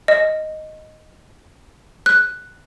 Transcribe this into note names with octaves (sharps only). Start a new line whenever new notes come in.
D#5
F#6